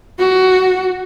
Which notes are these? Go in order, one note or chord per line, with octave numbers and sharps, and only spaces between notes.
F#4